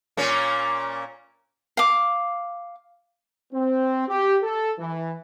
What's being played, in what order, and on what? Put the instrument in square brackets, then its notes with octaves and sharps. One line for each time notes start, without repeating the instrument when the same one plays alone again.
[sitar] A#2 A#3 C#4
[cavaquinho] F5 D6
[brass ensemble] C4
G4
A4
E3